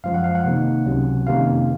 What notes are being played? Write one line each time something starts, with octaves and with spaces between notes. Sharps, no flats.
F#2 F3 G#3 F5
F#5
F5
F#5
C3 D#3 A#3 D#4
C#2 C3 F#3 C#4
F2 C3 D#3 A#3 C#4 F5